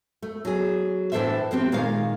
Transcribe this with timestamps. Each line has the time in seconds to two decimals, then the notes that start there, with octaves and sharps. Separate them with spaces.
0.22 A3
0.45 F#3 G#4
1.12 A2 E3 D4 A4 C5 E5
1.51 F3 B3 C4 G4
1.72 A#2 D#3 G#3 A#4 F5